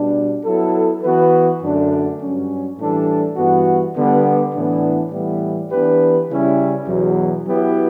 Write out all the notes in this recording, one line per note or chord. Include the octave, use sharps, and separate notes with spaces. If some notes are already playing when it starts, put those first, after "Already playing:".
Already playing: B2 G3 D4
F#3 B3 E4 A4
E3 B3 F#4 B4
F#2 D3 A3 D4
G2 F#3 C#4
A2 E3 G3 D4 A4
G2 E3 B3 F#4
D3 G3 B3 D4
A2 E3 B3 D4
A2 E3 G3 B3 E4
E3 B3 D4 G4 B4
C#3 G3 C#4 E4
E2 B2 F#3
F#3 B3 E4 G4 B4